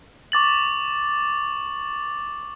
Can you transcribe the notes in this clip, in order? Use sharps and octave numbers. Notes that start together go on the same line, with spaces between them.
C#6 D6 A6 F#7